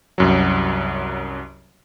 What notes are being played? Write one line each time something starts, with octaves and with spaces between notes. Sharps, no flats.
C2 F#2 F#3